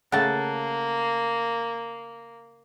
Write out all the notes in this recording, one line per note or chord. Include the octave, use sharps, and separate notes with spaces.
C#3 A3 A#3 F#5 A5